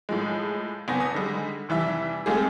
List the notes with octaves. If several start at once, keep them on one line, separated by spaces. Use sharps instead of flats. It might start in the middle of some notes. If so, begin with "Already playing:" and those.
A2 F3 G#3
F#1 B3 G#5 A#6
D#6
D3 G3 G#3
F1 E3 G3 E5
G#3 A3 C4 F4 G4 G#4